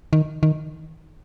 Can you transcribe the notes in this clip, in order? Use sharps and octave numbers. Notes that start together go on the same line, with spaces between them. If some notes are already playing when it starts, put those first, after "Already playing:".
D#3
D#3